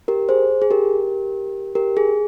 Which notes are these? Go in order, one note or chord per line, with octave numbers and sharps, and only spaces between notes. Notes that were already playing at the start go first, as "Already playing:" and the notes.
G4 A#4
G#4 C5
G#4
G4 A#4
G4 A#4
G#4